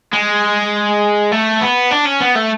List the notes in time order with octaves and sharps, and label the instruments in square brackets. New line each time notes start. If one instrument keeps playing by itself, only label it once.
[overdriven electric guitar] G#3
A3
B3
D4
C#4
B3
A3